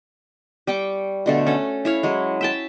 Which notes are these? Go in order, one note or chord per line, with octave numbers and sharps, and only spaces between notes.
G3 G5 C#6 D6
B2 D3 A3 A4
C#4 A4
E4 C#5 F5
F#3 G#3
E5 G5 A5